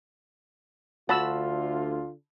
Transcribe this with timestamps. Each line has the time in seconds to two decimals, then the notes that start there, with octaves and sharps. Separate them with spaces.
1.09 D2 D3 F3 F4 F#4 A5 B5 E6